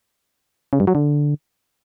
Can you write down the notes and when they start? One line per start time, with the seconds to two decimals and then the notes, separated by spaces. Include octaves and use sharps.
0.73 C#3
0.80 G2
0.87 F#3
0.95 D3